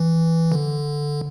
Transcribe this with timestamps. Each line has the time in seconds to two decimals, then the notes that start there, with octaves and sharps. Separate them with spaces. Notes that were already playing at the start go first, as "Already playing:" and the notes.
Already playing: E3
0.52 D3